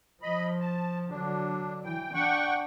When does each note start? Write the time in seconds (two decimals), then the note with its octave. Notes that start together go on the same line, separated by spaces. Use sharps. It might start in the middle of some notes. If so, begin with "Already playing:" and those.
0.22 F3 D#5 B5
0.60 A5
1.10 D3 F#3 D4
1.84 E3 G5
2.14 D4 F#5 G5 C#6